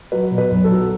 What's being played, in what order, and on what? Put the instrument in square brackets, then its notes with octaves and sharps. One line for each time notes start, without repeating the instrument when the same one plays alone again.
[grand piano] F#3 B4
B2
B4
B1
A4
F#3